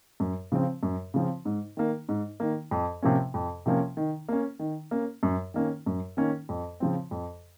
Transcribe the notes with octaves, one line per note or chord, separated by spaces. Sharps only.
F#2
C#3 F3 C4
F#2
C#3 F3 C4
G#2
D#3 A#3
G#2
D#3 A#3
F2
C3 F3 A#3 C#4
F2
C3 F3 A#3 C#4
D#3
A#3 C#4
D#3
A#3 C#4
F#2
D#3 A#3 C#4
F#2
D#3 A#3 C#4
F2
C#3 F3 C4
F2